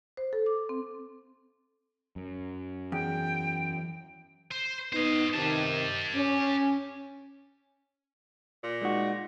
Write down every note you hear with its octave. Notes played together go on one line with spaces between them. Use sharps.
C5
A4
D6
C4
F#2
E2 G5
C5
B3 D#4 C5 D#5
C3 D#3 G4 A5
C#4
A#2
G#3 D#4 F#4